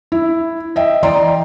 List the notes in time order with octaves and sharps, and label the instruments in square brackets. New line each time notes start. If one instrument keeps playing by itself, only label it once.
[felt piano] E4
D#5 E5 G5
E3 D5 D#5 G5 A#5 C6